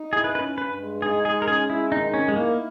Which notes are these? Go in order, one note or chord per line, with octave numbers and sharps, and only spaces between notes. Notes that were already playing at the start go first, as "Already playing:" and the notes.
Already playing: D#4
E4 G#4
B4
C#4 B4
G2 B4
G#3
D#4 G#4
G#3 G#4
A#4
C#4 G#4
G#3 E4
D#3 D#4
C#4 D#4
G#3
A#3 E4